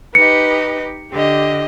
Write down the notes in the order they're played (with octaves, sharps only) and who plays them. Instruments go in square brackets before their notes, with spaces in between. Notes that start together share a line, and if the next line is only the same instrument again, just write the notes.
[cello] D#4 G4 [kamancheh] B4 D#5 [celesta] C#7
[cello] D3 [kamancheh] G4 D#5